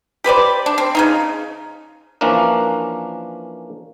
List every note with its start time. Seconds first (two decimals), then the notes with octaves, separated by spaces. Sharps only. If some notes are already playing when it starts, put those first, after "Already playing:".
0.24 G4 B4 C5 D5
0.66 D4
0.78 C4
0.95 C#3 F#3 D#4
2.21 E3 F3 A#3 C#4 D4 A#4